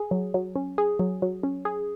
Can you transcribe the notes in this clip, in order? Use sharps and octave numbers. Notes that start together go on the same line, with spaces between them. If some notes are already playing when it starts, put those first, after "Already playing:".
Already playing: G#4
F#3
F#3
C#4
G#4
F#3
F#3
C#4
G#4